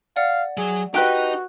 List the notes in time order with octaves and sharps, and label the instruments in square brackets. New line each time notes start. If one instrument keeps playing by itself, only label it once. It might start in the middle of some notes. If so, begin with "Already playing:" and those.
[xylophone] D5 F#5 [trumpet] F5
[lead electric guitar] F#3 [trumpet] G#4
[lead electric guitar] D#4 D#5 [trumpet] F#4 [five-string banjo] G4 B4 [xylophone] F#6 D7